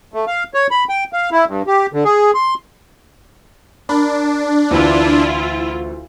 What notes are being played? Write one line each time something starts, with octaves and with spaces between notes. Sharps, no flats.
A3
F5
C#5
B5
G5
F5
E4
G2
G4
D3
G#4
C6
D4 A#4 B5
D2 E3 E4 F4